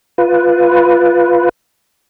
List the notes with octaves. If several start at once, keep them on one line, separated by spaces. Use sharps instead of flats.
F4 B4